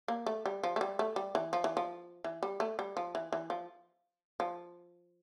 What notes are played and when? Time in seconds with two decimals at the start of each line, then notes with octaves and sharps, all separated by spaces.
0.08 A#3
0.26 A3
0.46 G3
0.64 F3
0.76 A3
0.81 G3
0.99 A3
1.16 G3
1.35 E3
1.53 F3
1.64 E3
1.77 F3
2.24 E3
2.43 G3
2.60 A3
2.79 G3
2.97 F3
3.15 E3
3.33 E3
3.50 F3
4.40 F3